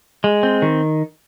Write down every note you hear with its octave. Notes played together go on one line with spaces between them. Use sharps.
G#3
C4
D#3